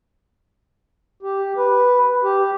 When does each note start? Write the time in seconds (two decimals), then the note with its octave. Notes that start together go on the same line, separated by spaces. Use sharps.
1.23 G4
1.57 B4
2.24 G4